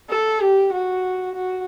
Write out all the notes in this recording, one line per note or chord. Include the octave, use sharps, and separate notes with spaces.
A4
G4
F#4
F#4